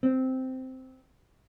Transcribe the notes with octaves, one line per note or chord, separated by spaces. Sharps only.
C4